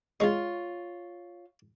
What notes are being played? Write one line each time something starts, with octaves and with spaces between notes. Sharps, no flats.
G#3 D#4 F4 C#5